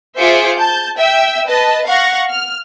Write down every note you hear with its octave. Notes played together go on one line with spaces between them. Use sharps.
F4 G#4 C5 E5 D6 C#7
A5 G6
E5 G5 E6
B4 D#5 A5
F5 F#5 C#6 A#6
F6